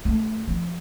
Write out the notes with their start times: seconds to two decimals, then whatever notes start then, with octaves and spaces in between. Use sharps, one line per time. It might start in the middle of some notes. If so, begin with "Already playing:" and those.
0.05 A3
0.48 F3